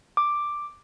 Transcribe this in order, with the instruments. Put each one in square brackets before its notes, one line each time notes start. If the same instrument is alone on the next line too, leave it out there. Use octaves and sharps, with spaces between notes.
[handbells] D6